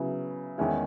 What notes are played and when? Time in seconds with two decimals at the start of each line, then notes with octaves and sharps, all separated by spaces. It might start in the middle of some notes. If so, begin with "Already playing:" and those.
Already playing: C#3 F#3 B3 E4
0.58 E2 D#3 G#3 C#4 E4